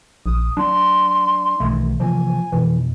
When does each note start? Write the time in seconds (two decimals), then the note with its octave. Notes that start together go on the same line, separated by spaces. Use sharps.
0.26 A#1 D#6
0.57 F#3 D4 C6
1.60 B1 D#3 E3 A3
2.00 C3 E3 F3 A#3 G#5
2.52 F2 B2 E3